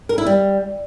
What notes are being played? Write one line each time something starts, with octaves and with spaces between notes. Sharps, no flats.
A#4
E4
G3